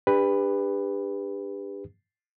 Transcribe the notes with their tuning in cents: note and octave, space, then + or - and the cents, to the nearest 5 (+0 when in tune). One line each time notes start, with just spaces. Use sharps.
D4 +0 G4 +35 B4 +5